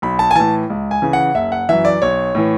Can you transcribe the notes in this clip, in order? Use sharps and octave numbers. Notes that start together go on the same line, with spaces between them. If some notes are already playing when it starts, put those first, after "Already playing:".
B1 B5
A5
G#5
A2 E3 A5
C#2
G#5
C#3 E3
F#5
F#1 E5
F#5
F#2 E3 E5
D5
B1 C#5
A2 E3